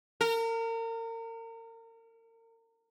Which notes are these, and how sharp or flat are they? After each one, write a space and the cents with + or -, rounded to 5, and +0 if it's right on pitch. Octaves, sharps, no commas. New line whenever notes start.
A#4 -35